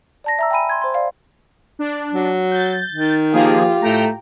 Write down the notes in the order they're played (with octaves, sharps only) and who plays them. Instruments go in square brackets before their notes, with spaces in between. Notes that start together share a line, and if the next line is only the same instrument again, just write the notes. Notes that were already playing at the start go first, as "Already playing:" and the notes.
[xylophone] D5 A5 A#6
E5 A#5 E6
G5 G#5 B5 D#7
C6 G#6
C5 C6
D5 F5
[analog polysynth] D4
[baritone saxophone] F#3
[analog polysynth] G6 A6
[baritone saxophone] D#3
[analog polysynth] F3 A#3 G#4 [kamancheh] F4 G4
[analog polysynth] A2 G5 A#5 [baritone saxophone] A3